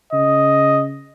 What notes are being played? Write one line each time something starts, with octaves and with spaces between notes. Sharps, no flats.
C#3 D#5